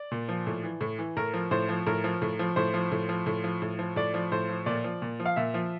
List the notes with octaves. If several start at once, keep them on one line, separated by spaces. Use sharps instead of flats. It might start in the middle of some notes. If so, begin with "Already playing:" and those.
Already playing: D5
A#2
F3
A2
E3
A2
E3
A2 A#4
F3
A2 C5
F3
A2 A#4
F3
A2
F3
A2 C5
F3
A2
F3
A2
F3
A2
F3
A2 D5
F3
A2 C5
F3
A#2 D5
F3
A#2
F3
F5
A#2 E5
F3